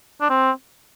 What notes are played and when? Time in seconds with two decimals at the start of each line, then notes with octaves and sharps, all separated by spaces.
0.21 D4
0.30 C4